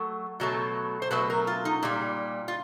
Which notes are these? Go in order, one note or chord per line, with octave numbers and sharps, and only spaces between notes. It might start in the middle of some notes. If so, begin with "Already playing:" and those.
Already playing: F#3 A3
B2 F#3 A3
C5
B2 F#3 A3 B4
A#4
F4
D#4
A#2 G3
F4